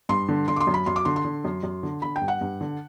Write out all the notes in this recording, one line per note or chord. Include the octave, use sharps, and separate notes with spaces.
G2 C6
D3
D3 C6
D6
C6
F#2
B5
F#2 C6
D6
D3 C6
C6
D3
F#2
F#2
D3
D3 B5
G5
G2
F#5
G2
D3